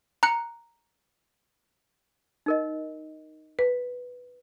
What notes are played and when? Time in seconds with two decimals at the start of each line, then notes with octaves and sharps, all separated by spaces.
0.23 A#5 F#6 C#7
2.46 D#4 A#4 D#5
3.59 B4